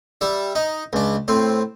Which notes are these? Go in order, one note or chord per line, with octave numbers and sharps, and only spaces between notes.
G3 E5
D#4
C#2 D4
A2 C4